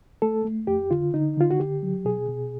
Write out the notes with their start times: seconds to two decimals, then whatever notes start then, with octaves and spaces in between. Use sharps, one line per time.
0.22 A3 A4
0.45 A3
0.67 F2 G4
0.91 D3 F4
1.14 D3 D#4
1.37 D3 F4
1.51 F#4
1.59 D3 G4
1.83 F#3
2.05 B2 G#4
2.29 B2